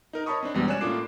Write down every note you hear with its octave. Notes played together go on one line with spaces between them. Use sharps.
D#4 A#4
C#5 D#5 A5 B5 C#6 D#6
C4 D4
E2 B2 G3 G#3
C#4 C#5 D5 G#5 F#6 E7
A2 A#3 D4 F4 D6 C7